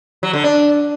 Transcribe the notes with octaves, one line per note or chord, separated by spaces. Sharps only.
F#3
D3
D4